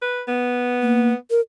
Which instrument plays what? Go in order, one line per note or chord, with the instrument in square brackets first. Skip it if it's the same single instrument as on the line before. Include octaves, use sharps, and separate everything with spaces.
[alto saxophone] B4
B3
[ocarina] A#3
A#4